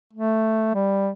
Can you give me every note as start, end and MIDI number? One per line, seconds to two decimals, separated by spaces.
0.13 0.70 57
0.75 1.10 55